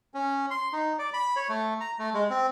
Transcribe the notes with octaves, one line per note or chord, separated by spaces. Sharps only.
C#4
C6
D#4
D5
B5
C#5
A3
A#5
A3
G#3
C4